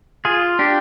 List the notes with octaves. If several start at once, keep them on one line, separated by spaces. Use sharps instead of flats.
F4 G#4
D4 G4